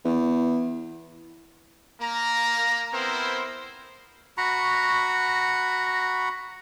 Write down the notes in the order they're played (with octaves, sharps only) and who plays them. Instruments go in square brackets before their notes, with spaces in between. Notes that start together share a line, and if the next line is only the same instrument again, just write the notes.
[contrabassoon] E2
[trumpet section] A#3 A#5
B3 C4 E4 A#4 C5
[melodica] F#4 A#5 B5 C#6